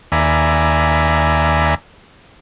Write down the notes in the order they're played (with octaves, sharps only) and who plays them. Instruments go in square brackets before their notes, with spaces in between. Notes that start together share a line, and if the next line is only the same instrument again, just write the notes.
[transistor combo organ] D#2 D5 E5 G#5 A#5 B5